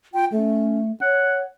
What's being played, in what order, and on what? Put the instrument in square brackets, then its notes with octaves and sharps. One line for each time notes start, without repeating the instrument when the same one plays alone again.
[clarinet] F4 [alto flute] G5
[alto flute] A3 [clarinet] C#4
[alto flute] C#5 [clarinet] F#5